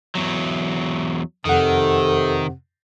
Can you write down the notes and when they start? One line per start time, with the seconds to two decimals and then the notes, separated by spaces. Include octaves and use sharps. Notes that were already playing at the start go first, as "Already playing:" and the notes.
0.15 E2 F#3
1.45 F2 C3 D#3 A4 F#5